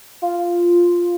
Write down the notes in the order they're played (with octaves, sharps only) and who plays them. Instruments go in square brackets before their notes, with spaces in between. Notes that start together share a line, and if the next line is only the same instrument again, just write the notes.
[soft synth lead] F4